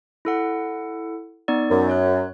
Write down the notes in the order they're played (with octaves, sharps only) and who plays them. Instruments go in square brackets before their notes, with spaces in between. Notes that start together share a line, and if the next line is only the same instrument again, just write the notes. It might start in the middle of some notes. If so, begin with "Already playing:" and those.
[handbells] E4 A4 F#5
B3 D#4 D5
[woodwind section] F#2
[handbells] C#5 F#6